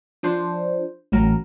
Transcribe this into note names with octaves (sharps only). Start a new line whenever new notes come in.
F3 D4 C5
A1 F#3 A#4